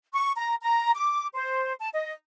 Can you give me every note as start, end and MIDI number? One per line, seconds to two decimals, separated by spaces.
0.13 0.30 85
0.36 0.55 82
0.62 0.91 82
0.94 1.27 86
1.34 1.73 72
1.79 1.88 81
1.93 2.12 75